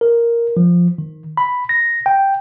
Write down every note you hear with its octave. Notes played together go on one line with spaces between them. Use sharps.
A#4
F3
D#3
B5
A#6
G5